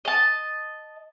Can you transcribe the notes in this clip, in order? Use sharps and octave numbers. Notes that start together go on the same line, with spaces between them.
D#5 A5